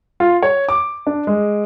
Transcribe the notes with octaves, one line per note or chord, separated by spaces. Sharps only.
F4
C#5
D6
D4
G#3